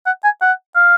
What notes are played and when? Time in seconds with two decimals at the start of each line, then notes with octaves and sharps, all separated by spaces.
0.06 F#5
0.24 G#5
0.41 F#5
0.76 F5